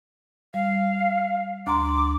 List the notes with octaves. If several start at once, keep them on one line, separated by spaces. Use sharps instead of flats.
G3 F5
D2 A#5 C6 D6